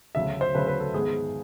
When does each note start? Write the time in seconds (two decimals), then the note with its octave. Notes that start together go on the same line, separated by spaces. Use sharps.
0.15 D2 C#3 F#3 E5
0.41 C5
0.55 D2 C#3 F#3 B4
0.67 B4
0.80 A4
0.93 G#2 D#3 G#3 B3 G#4